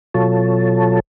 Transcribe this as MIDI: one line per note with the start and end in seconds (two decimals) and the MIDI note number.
0.14 1.00 47
0.14 1.00 54
0.14 1.00 65
0.14 1.00 69
0.14 1.00 73
0.14 1.00 81